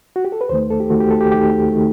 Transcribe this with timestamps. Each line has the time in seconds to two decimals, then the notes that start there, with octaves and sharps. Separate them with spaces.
0.16 F#4
0.25 G4
0.32 A4
0.41 B4
0.49 D#2 D#3 A3 C5
0.70 A4
0.80 G4
0.90 D#2 D#3 A3 F#4
1.01 G4
1.11 A4
1.21 G4
1.32 D#2 D#3 A3 G4
1.72 D#3 A3